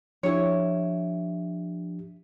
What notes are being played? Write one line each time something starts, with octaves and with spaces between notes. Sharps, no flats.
F3 D4 E4 G4 C#5